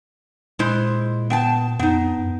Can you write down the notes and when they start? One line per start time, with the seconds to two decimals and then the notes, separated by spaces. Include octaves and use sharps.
0.59 A#2 G#3 E4 C5
1.30 B3 G5 A5
1.79 F2 B3 D#4
2.19 F#2